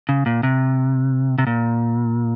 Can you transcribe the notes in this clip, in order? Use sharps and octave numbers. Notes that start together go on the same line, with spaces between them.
C#3
A#2
C3
C3
A#2